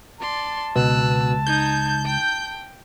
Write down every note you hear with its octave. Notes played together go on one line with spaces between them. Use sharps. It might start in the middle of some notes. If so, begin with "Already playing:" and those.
D5 A5 C6
C#2 B2 E6 F#6
D#4 G6 G#6
G5